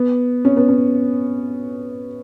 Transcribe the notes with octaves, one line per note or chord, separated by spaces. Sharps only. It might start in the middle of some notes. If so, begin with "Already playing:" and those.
Already playing: B3
C#4
B3
C#4